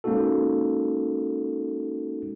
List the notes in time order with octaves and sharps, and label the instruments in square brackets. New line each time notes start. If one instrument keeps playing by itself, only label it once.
[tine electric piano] G#3 A#3 C#4 D#4 F#4 A4